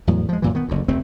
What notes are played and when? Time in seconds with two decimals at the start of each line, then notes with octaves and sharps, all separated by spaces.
0.07 E2 A2 F#3
0.29 F3 G#3
0.42 F#2 A#2 E3
0.55 D#3 B3
0.69 F#1 D2
0.88 F1 D#2 A3 C4